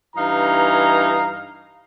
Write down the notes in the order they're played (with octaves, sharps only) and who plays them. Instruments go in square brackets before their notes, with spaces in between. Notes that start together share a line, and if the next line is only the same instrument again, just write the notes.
[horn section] G2 E3 D#4 F5 A#5